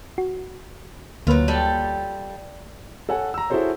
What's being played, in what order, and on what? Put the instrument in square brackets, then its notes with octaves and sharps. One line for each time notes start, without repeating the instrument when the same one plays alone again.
[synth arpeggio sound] F#4
[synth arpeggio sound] D2 A#3 B4 [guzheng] F#3 F4
[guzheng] G3 A4
[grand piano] A4 C#5 F#5 G#5
A#5 E6
E4 F#4 G#4 A4 C5 C#5